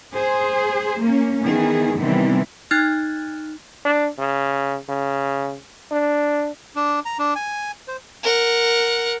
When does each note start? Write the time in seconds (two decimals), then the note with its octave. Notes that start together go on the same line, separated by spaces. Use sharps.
0.15 G#4 C5
1.03 A#3 C#4
1.43 D#3 E3 B3 G#4
1.98 C3 D#3 E3 G3 B3 C4
2.71 D#4 F6 F#6 G#6 A6
3.85 D4
4.18 C#3
4.89 C#3
5.91 D4
6.76 D4
7.05 A#5
7.19 D4
7.36 G#5
7.88 C5
8.23 A#4 F#5